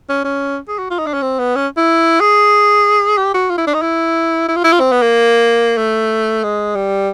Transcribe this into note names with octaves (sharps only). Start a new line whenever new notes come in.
C#4
C#4
G#4
F#4
F4
D#4
D4
C#4
C4
B3
C#4
E4
G#4
G4
F#4
F4
E4
D4
D#4
E4
E4
F4
E4
F4
C4
B3
A#3
A3
G#3
G3